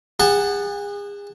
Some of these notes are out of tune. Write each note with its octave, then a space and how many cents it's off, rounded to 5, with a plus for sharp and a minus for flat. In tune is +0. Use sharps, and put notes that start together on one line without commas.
G#4 -35 F#5 +0 A5 +0